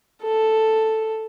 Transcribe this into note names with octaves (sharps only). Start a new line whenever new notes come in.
A4